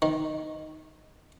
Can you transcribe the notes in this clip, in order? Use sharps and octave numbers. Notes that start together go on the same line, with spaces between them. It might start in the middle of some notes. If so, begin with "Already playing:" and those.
D#3